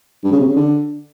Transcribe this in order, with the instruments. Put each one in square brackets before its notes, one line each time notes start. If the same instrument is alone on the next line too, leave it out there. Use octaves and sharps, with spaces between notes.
[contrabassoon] G2
C#3
C3
C#3
D3